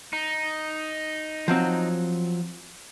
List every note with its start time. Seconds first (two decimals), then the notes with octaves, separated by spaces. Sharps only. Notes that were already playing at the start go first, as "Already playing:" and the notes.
0.13 D#4
1.48 F3 F#3 C4